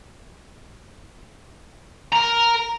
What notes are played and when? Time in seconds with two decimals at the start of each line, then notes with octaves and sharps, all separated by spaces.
2.12 A#4 A#5